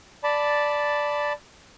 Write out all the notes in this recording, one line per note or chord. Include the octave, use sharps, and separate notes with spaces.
D5 A5 B5